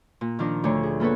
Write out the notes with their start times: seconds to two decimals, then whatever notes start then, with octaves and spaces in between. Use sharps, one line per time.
0.21 A#2
0.39 D#3 F3 D4 A#4 D#5
0.64 D2 D3 C#5
0.83 G#4
1.00 A#3 B3 A4 B4 C#5